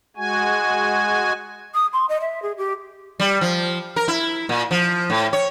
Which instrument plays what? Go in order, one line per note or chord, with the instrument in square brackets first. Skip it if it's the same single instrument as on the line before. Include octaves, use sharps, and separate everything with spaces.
[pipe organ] G#3 F#4 G#5
[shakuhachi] D#6
C6
D#5
E5
G#4
G4
[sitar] G3
F3
A#4
E4
A#2
F3
A2
C#5